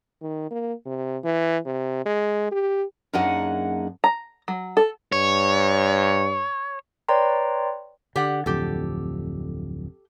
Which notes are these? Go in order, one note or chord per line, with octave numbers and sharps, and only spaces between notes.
D#3
A#3
C3
E3
C3
G#3
G4
F#2 A#3 D4 D#4 G#4 F#5
A#5
F#3
A4
G2 C#5
B4 C#5 D5 G5 A#5 C6
D3 G4 D5 F#5
D1 F2 D3 G4 A4